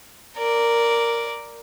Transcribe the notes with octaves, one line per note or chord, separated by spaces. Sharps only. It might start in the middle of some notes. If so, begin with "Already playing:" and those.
A#4 D5